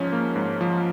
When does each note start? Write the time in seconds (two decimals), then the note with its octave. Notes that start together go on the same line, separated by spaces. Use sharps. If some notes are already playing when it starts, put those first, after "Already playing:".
Already playing: G#2 F3 C#4
0.12 A#3
0.36 G#2
0.61 F3